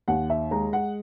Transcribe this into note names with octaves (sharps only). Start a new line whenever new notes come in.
D#2 F#5
E5
G#3 A#5
F#5